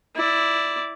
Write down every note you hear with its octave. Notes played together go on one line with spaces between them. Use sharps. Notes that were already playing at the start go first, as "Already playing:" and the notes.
E4 D5